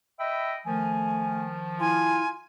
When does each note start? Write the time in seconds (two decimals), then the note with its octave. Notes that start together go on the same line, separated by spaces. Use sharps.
0.20 D#5 E5 G5 B5
0.66 D#3 F3 A3 G#5
1.80 E4 F4 G#5